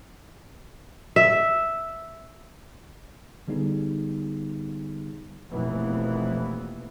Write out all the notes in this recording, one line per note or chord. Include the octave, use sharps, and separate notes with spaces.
E5
D3 G3 B3 D#4 G#4
F1 B1 F2 E3 A#3 B3